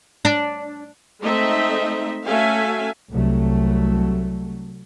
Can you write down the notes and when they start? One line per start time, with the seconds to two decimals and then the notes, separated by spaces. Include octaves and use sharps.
0.25 D4
1.22 G#3 A3 C4 D#4 D#5 E5
2.26 A3 C#4 F#4 E5 F5 G#5
3.11 C2 F#3 A3